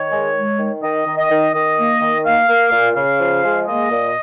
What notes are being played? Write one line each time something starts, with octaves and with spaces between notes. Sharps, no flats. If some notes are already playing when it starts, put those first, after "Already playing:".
Already playing: D#3 C#5
G#3
G#3
D#3
D#3 D#5
D#3
D#5
D#3
D#3 D#5
A#3
D#3
A#3 F5
A#3
A#2
C#3 F5
F3
G#3
A#3 D#5
A#2